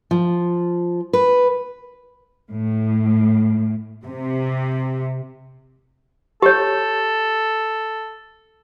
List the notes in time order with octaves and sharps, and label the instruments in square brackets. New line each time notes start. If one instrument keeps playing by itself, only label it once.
[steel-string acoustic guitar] F3
B4
[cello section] A2
C3
[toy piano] G4 C#5 [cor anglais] A4